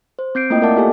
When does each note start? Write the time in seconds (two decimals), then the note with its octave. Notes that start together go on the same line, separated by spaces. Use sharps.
0.19 C5
0.35 C4 G6 C7 D7
0.50 A3 A#3 E4 F4 D#5 G5
0.62 A#4 D5 E5 F#5 A5 D6
0.76 B3 F4 G4 A4 G#5 A5